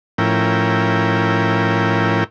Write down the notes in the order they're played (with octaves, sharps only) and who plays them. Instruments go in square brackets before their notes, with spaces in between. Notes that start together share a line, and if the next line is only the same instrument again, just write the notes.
[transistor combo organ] A2 F3 C#4 E4 A#4 G5